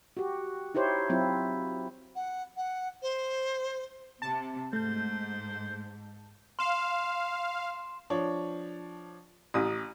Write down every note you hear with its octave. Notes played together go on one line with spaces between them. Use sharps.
F#4 G4
D#4 E4 G4 C5 C#5
F#3 C4 E4 F4
F#5
F#5
C5
C3 A5
G#2 A3 C5 G6
F5 C6 E7
F3 D4 C#5
A1 D#6